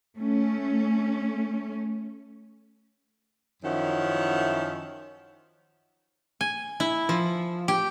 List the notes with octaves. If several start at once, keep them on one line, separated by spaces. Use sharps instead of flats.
A3 C#4
F#2 D#3 F3 C#4 E4 F#5
G#5
E4
F3
G4